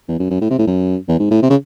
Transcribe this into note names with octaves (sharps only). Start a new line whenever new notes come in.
E2
F#2
F#2
A2
C3
A2
F#2
E2
G#2
A2
C3
C#3